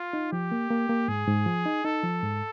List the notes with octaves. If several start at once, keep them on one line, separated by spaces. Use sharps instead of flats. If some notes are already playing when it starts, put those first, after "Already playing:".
Already playing: F4
D#4
F3 G4
A#3
A#3
A#3
G#2 G#4
G#2
F3
D#4
D#4 A4
F3
G#2